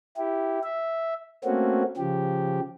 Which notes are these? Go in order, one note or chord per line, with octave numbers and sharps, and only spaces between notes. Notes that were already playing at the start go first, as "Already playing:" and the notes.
E4 G4
E5
A3 A#3 C4 C#4 F#4
C#3 F3 G4